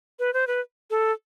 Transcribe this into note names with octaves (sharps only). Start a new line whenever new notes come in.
B4
C5
B4
A4